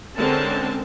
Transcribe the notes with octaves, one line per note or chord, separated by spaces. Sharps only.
D3 G#3 C4 C#4 A#4 A5